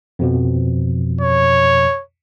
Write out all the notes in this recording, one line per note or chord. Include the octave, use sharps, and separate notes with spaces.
F2 B2 F3
C#5